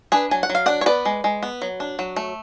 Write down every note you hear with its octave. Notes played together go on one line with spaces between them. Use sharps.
D4 G#4 B4
F#3 G#5
F#5
F#3
F5
D4 D5 F#5
C#5
B3 B4 D5
G#3
G#3
B3
F#3
D4
F#3
A3